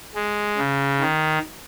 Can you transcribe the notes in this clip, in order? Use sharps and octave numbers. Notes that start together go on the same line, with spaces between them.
G#3
C#3
D#3